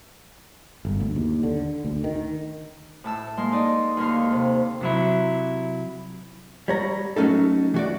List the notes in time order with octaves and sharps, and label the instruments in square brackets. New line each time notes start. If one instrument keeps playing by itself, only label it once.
[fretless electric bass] G1
D2
D#2
D3
D2
D#3
[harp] A2 A5 E6
G#3 A#3 C6
D#4 D5 D#5
D#2 D3 A#4 F5
C3
[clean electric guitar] C3 F#3 E4
[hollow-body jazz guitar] G3 C#5 A#5
F#3 A3 C#4 D#4 A4
E3 F#4 D5